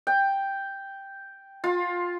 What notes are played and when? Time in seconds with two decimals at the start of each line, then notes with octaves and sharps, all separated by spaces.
0.07 G5
1.64 F4